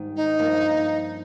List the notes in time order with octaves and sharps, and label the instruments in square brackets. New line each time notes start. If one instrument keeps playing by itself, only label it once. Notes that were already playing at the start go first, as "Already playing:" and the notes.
Already playing: [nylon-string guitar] G#2 D#3 G3
[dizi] D#4
[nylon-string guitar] G2 F3 A#3 D4